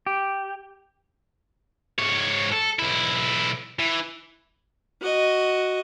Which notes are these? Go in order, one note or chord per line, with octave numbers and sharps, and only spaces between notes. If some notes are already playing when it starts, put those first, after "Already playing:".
G4
G#2 C#5
A4
B1 E4
E3
F#4 D#5